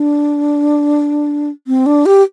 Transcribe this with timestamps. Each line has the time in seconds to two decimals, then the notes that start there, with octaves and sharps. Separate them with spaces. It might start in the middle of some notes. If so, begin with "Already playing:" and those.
Already playing: D4
1.67 C4
1.86 D4
2.06 G4